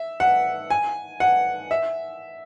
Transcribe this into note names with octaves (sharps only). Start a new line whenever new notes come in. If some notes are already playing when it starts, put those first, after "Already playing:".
Already playing: E5
F#5
G#5
F#5
E5